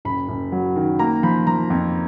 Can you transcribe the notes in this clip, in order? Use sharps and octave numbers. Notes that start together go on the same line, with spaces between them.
F#1 B5
F#1
F#3
D#3
A#3 A#5
F3 B5
F3 A#5
F2